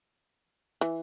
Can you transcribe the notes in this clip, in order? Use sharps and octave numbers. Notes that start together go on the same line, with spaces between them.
E3